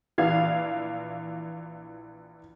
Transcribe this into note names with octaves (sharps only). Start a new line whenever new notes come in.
A#1 E3 F5 G#6